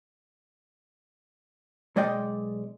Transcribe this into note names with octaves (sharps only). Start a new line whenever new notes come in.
B1 G#3 D5 D#5 G5